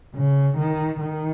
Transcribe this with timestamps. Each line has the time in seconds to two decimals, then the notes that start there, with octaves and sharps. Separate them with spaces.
0.15 C#3
0.58 D#3
1.00 D#3